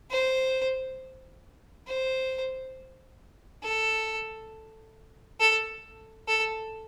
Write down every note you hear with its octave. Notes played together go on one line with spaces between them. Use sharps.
C5
C5
A4
A4
A4